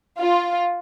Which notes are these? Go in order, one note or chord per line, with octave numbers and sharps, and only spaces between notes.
F4